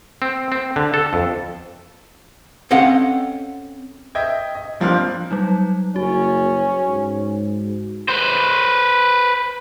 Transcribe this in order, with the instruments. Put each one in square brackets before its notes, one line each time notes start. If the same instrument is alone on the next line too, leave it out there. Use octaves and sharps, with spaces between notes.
[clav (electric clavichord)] C4
C4
D3
A4
F2
[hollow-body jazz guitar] C4 C#4 A4 D#5 F5 F#5
[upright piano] D#5 E5 G5 G#6
D#5
G2 F3 A#3 C4 F6 F#6
[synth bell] F#3 G3 D#4
[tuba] F#1 [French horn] C#4 [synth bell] F#4
[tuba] G#2
[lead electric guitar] B4 C5